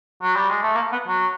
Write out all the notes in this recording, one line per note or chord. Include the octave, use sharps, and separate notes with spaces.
F#3
G3
G#3
A3
A#3
B3
F#3